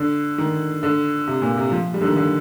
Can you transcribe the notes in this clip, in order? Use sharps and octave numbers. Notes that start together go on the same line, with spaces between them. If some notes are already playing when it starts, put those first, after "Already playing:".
Already playing: D3
D#3
D3
C3
A#2
C3
F3
G3
D3
D#3
D3